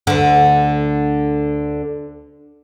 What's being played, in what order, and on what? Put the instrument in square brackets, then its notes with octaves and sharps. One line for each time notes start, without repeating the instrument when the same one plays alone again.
[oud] D2 D3